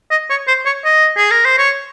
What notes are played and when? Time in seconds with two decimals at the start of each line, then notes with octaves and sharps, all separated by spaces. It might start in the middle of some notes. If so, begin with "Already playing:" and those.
0.11 D#5
0.30 C#5
0.47 C5
0.66 C#5
0.85 D#5
1.17 G#4
1.31 A#4
1.45 C5
1.58 C#5